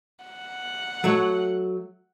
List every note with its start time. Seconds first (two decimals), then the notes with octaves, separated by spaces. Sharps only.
0.24 F#5
1.04 F#3 A3 C#5